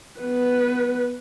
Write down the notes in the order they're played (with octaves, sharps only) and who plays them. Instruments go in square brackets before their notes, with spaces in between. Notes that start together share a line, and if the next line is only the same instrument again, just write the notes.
[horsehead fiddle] B3 B4